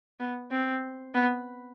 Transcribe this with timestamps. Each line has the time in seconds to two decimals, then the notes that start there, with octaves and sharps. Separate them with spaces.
0.20 B3
0.51 C4
1.14 B3